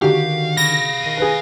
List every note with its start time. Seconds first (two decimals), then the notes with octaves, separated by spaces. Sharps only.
0.02 D3 D#3 F#4 G4 F5
0.57 F5 B5 A#6
1.02 D#3 C7 D#7
1.17 G#4 B4